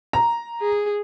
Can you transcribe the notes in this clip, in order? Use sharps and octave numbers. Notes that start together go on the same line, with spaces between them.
A#5
G#4